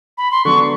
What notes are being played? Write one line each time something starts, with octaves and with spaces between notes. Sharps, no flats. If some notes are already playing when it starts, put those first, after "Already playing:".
B5
C6
D3 F#3 B3 D4 C#6